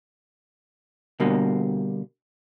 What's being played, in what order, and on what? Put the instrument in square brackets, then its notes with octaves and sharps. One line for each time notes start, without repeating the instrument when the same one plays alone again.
[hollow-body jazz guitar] B2 D3 G3 A#3